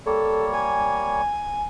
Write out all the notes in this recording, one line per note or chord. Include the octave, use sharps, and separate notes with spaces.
G3 A#3 A4 C#5
G#5